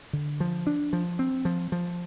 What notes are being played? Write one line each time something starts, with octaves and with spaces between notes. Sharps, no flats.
D3
F3
D4
F3
C4
F3
F3